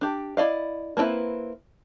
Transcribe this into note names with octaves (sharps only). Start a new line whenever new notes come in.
D4 G4
E4 D5 D#5 F5
A#3 C4 D4 E4 B4